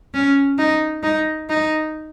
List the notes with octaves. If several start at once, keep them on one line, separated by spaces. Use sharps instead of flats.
C#4
D#4
D#4
D#4